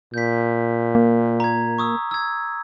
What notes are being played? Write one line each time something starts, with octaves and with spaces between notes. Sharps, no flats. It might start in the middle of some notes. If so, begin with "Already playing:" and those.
A#2 G6 B6
A#3
A#5 G#6
C#6 D#6 E6
E6 G#6